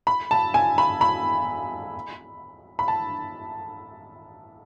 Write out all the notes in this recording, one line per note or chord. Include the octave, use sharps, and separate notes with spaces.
B5
A5
G#5
B5
B5
B5
A5